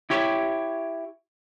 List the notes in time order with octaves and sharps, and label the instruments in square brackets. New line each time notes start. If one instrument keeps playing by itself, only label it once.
[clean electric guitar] E4 G4 C#5